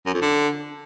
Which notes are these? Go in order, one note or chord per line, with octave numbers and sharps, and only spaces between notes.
F#2
F2
D3